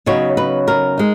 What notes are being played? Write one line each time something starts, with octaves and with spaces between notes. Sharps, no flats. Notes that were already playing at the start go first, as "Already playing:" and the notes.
C#3 F#3 B3 D#4 C#5
B4
A#4
G#3 D#4